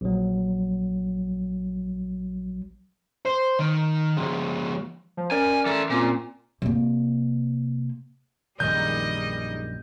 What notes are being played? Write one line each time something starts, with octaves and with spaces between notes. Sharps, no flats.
A#1 F#3
C5
D#3
F3 G#3
F3
C#4 A#4 D5 G#5
E3 A4
A#2 C4 C#4 F4
C3 A#3
A#1 F#2 D#3 G3 G#3 D#5 G6